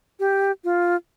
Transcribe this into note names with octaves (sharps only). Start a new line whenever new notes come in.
G4
F4